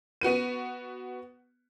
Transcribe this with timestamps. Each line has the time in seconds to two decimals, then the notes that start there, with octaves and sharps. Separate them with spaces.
0.21 B3 F#4 B4 D#7